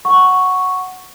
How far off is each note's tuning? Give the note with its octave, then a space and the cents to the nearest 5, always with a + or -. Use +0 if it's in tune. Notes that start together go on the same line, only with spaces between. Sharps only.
F#5 +0 C#6 +0